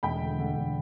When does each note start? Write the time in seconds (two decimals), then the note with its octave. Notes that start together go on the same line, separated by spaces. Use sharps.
0.03 E1 G5 B5
0.21 D3
0.39 D3
0.56 E1